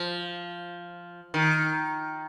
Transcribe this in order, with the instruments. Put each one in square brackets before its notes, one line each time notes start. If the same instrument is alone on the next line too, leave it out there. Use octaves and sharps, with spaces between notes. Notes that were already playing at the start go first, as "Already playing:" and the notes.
Already playing: [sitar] F3
D#3